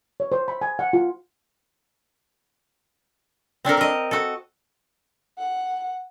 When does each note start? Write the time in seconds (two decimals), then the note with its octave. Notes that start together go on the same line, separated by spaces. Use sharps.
0.20 C#5
0.32 C5
0.48 B5
0.62 G#5
0.79 F#5
0.93 F4
3.65 C4 D4 A4 A#4
3.77 A#4 D#5
4.11 F#4 A4
5.38 F#5